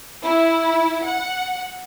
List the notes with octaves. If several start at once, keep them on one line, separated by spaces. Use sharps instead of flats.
E4
F#5